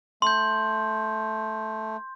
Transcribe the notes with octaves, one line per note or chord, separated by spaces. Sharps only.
A3 C6 G6